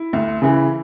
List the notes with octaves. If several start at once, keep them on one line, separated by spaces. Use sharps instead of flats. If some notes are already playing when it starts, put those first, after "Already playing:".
Already playing: E4
D2
C#3 E3